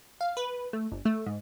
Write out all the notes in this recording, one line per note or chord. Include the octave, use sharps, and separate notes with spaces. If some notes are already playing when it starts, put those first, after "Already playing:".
F5
B4
A3
G1
A3
G#2